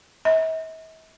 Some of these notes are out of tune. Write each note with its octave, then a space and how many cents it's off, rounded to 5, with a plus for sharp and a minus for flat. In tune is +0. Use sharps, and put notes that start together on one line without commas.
E5 -45